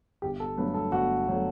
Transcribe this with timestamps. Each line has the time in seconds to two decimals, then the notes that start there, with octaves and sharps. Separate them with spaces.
0.22 G1 G4
0.40 A4
0.58 G2 F#3 A3 B4
0.74 A4
0.92 G1 F#4
1.28 F#3 A3